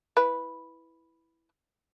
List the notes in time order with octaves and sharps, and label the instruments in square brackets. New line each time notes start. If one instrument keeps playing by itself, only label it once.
[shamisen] E4 B4